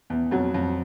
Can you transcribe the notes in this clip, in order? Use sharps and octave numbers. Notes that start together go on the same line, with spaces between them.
E2
F2 F#3
F2